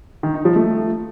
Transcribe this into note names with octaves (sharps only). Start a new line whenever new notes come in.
D#3
D#4
F3
A3